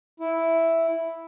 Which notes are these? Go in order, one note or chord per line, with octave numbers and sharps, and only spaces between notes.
E4